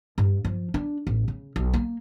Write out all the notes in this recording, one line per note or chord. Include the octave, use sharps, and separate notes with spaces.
G2
F3
D4
A1
C#3
B1
A#3